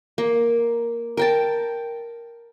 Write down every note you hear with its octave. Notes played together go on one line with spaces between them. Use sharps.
A#3
A#4 G5 A5